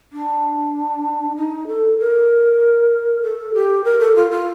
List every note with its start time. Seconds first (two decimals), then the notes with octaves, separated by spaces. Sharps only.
0.13 D4
1.36 D#4
1.67 A4
1.99 A#4
3.23 A4
3.54 G4
3.84 A#4
3.99 A4
4.16 F4
4.31 F4